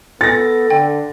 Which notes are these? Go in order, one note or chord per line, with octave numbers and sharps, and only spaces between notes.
B3 A4 A6 A#6
D3 G5